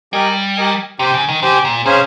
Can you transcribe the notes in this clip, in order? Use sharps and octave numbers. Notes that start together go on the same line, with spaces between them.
G3 G4 A#4 D#5 G#5
G4 A#4 D#5 G#5
C3 G4 C5 G5
C#3
D#3
C#3 G4 C5 G5
A#2
C3 C#4 G#4 C5 F5